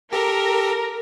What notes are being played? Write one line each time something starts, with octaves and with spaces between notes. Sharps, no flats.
G4 A4 A#4